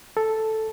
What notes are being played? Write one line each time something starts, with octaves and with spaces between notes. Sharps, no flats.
A4